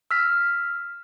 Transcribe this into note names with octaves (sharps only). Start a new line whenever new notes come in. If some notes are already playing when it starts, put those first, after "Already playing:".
E6 F6 B6